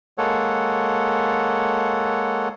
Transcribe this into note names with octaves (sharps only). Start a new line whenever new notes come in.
G#3 A#3 A4 C#5 F#5